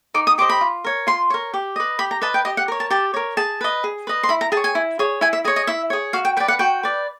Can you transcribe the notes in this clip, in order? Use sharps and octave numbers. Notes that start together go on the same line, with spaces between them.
D#4 D6
D#6
G4 C5 D#5 D6
B5
F4
A#4 C#5
F4 C6
A#4 C#5
G4
B4 D#5
G4 B5
A#5
B4 D#5 A5
G5
G4 D#5
F#5
A#4 C#5
A5
G4 A5
A#4 C#5
G#4 A5
B4 D#5
G#4
B4 D#5
C6
E4 B5
A#5
G#4 A5
C#5
G#5
E4
G#4 C#5
E4 G#5
E5
G#4 C#5 D#5
D#5
E4 E5
G#4 C#5
F#4 F5
G5
B4 D5 G5
F#5
F#4 G5
B4 D5